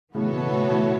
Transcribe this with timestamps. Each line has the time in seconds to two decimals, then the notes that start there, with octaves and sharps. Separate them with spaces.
0.14 A2 C#3 E3 B3 F#4 A4 C#5
0.33 B2
0.51 A2
0.70 A2